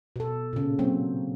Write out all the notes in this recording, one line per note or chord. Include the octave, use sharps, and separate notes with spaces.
B2 A4
A#2 C#3
F#3 A#3 C4